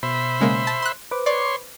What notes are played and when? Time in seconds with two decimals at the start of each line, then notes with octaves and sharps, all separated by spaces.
0.03 B2 C5 E5 B5
0.40 C#3 G#3 A#3
0.67 A5
0.82 C6 F#6
1.11 B4 C5 D6
1.26 C#5 D5 C6